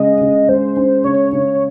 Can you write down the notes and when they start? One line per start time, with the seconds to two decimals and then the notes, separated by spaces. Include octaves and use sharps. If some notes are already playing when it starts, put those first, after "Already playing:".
Already playing: C#3 G#3 C#4 D#5
0.21 C#3
0.49 G#3 C5
0.77 C#4
1.04 C#3 C#5
1.33 C#3